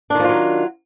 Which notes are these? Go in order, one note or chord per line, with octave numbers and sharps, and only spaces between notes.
D#3 F3 F#3 D4 F4